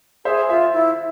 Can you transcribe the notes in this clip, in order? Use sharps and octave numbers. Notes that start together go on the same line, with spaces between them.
G#4 C5 E5
F4 C5 E5
E4